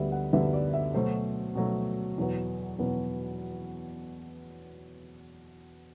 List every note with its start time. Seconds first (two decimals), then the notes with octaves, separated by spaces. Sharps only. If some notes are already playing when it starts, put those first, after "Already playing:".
Already playing: D2 D3 G3 B3 E5
0.12 F#5
0.33 D2 D3 G3 B3 E5
0.53 D5
0.73 E5
0.94 B2 F#3 A3 C5
1.55 B2 F#3 A3
2.17 E2 B2 F#3 B3
2.78 E2 B2 F#3 B3